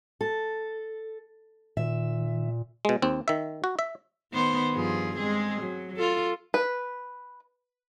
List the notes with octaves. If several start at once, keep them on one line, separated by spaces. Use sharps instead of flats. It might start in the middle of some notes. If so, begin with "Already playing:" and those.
A4
A#2 D#3 E5
B2 G#3
D#2 C4
D#3 E5
F#4
E5
D#3 B3 C5
G2 F3 G#4
G#3 C4 G#4
F#3
F4 A4
B4